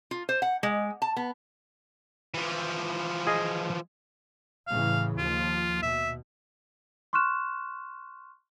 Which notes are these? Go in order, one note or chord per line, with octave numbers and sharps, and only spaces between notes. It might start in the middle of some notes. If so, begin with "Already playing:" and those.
F4
C5
F#5
G#3
A5
B3
E3 F3
G#4 D#5 F5
A2 C#3 E3 F5
D#2 F3 F4
B2 E5
C6 C#6 F6 F#6 E7